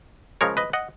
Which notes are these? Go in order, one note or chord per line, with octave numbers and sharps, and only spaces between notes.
C#3 F3 G#3 A#4 C#5
B4 D#5
D#5 F#5